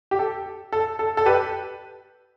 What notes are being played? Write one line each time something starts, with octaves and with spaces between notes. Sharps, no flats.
G4
A4
A4
A4
A4
G4 B4